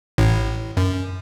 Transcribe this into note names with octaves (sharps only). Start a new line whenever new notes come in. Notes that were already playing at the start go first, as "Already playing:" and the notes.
A1 A2
F#2